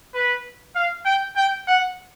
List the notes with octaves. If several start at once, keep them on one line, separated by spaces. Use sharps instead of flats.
B4
F5
G5
G5
F#5